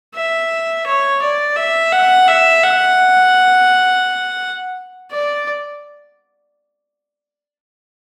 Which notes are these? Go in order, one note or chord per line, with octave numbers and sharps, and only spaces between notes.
E5
C#5
D5
E5
F#5
E5
F#5
D5